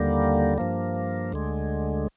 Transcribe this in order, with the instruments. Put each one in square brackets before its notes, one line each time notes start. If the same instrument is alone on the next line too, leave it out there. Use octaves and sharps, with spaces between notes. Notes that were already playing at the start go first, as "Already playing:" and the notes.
Already playing: [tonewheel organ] D#2 D3 G3 A#3
G2 F3 A#3
D2 D3 G#3